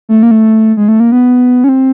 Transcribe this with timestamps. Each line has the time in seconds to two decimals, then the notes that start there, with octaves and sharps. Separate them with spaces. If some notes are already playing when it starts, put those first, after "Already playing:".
0.09 A3
0.23 A#3
0.31 A3
0.77 G#3
0.88 A3
1.00 A#3
1.12 B3
1.64 C#4
1.69 C4